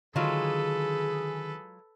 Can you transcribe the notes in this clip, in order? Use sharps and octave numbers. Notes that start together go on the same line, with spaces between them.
D3 D#3 F#3 G#3 F4 G#4 A4 B4